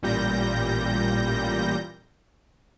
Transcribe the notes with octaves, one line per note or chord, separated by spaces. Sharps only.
A1 A#2 G3 G6 A#6